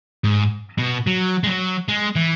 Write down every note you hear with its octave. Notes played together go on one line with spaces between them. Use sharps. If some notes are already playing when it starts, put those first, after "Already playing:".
G#2
B2
F#3
G#3
F#3
G#3
E3